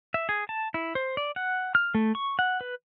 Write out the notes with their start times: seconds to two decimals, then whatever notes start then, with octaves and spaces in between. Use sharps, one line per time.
0.14 E5
0.29 G#4
0.49 A5
0.74 E4
0.95 C5
1.17 D5
1.36 F#5
1.75 F6
1.95 A3
2.15 C#6
2.39 F#5
2.61 B4